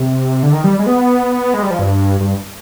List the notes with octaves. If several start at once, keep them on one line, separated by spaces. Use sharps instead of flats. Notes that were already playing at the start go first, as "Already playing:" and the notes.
Already playing: C3
D3
D#3
G3
G#3
B3
G#3
G3
F3
G2
G2